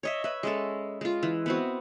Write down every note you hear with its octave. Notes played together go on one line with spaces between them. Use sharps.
C#5 D#5 E5
B4 E5
G#3 C#4 A4
G#3 F4
E3
B3 C4 F#4